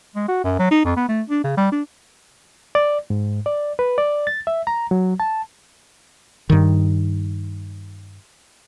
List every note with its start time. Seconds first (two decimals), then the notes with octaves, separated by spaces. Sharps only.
0.15 G#3
0.28 F#4
0.44 F#2
0.59 F#3
0.71 D#4
0.85 F2
0.96 B3
1.09 A3
1.30 D4
1.44 C#3
1.57 G3
1.72 D4
2.75 D5
3.10 G#2
3.46 D5
3.79 B4
3.98 D5
4.27 A6
4.47 E5
4.67 A#5
4.91 F#3
5.20 A5
6.50 G2 D#3